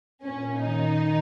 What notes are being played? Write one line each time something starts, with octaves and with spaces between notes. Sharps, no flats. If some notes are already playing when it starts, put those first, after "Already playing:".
A#2 C#4
D#3 D#4